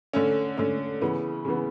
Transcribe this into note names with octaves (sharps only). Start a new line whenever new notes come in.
D3 A3 C#4
D3 A3 C#4
C#3 E3 B3
C#3 E3 B3